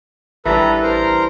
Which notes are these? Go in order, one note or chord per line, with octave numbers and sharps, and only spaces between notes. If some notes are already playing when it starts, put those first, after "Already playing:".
A1 E3 G3 D4 A4 B4 A#5
A#4 C5 A#5